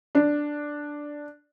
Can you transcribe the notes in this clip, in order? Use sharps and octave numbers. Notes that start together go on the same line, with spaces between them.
D4